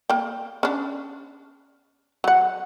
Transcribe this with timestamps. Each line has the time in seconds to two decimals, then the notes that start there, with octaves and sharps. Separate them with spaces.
0.10 A#3 G5
0.63 C#4 D4
2.24 F#3 F#5